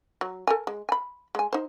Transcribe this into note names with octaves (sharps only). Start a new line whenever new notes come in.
F#3
A4 A#4 G#5
G#3
G#5 B5
G#3 G#5
D#4 C5